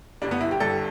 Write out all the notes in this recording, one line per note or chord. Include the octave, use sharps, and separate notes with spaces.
G1 G2 G3 D4
B3
E4
G4
G1 G2 G3 A4